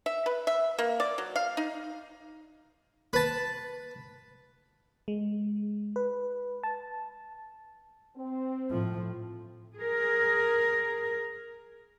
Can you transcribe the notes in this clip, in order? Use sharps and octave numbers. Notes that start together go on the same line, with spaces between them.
E5
B4
E5
A#3
D5
F#3
F5
D#4
B4 A5
G#3
B4
A5
C4
A2 F3
G#4 A#4